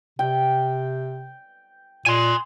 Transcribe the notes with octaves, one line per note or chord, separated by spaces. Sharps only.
C3 G5
A#2 G#5 C6